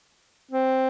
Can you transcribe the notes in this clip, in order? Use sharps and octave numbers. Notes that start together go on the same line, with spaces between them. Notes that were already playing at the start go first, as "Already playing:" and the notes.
C4